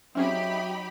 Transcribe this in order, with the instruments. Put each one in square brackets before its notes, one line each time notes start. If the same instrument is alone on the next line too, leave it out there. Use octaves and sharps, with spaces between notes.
[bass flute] F#3 [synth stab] C4 C#4 G#4 [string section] D#4 G4 B5 [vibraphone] E5